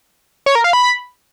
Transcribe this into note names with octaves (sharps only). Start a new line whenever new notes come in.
C#5
A#4
F5
B5